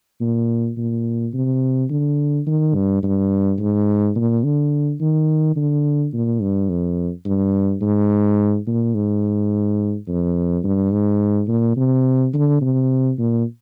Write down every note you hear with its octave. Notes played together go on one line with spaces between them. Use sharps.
A#2
A#2
C3
D3
D#3
G2
G2
G#2
A#2
D3
D#3
D3
A#2
G2
F2
G2
G#2
A#2
G#2
F2
G2
G#2
A#2
C3
D3
C3
A#2